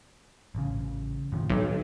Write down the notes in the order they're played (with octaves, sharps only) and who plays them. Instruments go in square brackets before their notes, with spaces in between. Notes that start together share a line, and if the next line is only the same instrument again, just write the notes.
[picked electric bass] A1 C#3
A2 D#3 F3
[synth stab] B1